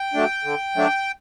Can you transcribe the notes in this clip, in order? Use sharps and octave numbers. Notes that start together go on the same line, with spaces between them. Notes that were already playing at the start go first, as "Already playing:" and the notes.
Already playing: G5
F#3 A3 D4
D3
F#3 A3 D4